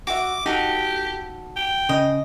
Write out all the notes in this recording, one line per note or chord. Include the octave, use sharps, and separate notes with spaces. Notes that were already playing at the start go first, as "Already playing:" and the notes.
F#4 E5 D6
D#4 F#4 G4 A4
G5
C#3 D#5